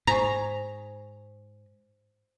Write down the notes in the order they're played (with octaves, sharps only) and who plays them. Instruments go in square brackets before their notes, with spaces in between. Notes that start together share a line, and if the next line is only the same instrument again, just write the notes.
[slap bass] G#2 [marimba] C5 G#5 C#6 [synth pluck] A#5